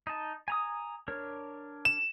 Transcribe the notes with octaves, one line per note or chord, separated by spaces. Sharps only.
D#4 A5
G#5 A#5 D#6
D4 A#4 C#5
E7